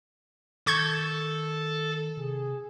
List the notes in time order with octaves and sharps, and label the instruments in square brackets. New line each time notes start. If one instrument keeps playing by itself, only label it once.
[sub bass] D#3 [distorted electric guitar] A4 [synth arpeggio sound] C#6 G6 G#6
[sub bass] C3 [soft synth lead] G#4